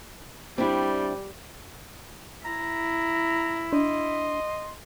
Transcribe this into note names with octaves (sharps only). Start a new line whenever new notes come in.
G3 C4 D4 E4
E4 A#5
D4 D#5 C6